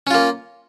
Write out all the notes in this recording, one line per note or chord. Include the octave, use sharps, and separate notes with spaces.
A#3 C#4 F4